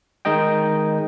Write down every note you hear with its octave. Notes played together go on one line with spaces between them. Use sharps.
D#3 G#3 D#4 D#5 G5